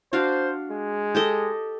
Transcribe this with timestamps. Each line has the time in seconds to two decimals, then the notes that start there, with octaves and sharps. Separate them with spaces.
0.13 D4 F#4 C5 F5
0.71 G#3
1.15 G4 A4 D#5